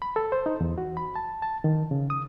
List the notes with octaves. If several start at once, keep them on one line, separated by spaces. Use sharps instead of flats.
B5
A4
C5
D#4
E2
F#4
B5
A5
A5
D#3
C#3
D#6